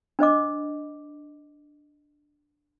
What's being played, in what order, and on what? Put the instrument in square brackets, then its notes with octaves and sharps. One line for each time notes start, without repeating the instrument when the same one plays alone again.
[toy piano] D4 C5 D#5 D6